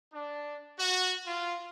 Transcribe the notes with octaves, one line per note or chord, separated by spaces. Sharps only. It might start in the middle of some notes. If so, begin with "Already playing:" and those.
D4
F#4
F4